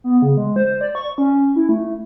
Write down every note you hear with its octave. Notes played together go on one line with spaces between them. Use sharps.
B3
C#3
G#3
C5
D5
C#6
C#4
E4
A3